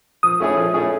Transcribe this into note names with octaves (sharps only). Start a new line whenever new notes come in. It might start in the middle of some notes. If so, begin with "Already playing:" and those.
F3 D#6
A3 C#4 E4 G#4
F3
A3 C#4 E4 G#4